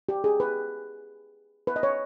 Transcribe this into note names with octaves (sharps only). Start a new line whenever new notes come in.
G4
G#4
B4
B4
D#5
C#5